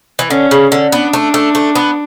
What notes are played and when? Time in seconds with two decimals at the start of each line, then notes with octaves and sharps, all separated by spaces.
0.19 E3
0.30 D3 C#4
0.51 C#3
0.72 D3
0.92 B3 D4
1.13 A3
1.34 A3
1.55 A3
1.75 B3